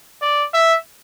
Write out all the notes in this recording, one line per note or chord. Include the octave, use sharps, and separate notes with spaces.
D5
E5